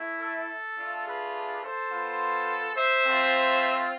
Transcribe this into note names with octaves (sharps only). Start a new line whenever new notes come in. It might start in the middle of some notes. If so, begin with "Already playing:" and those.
Already playing: A3 E4
A4
A3 D4 F4
G#4 B4
A4 C5
B3 F4
C5 E5
A3 C4 F4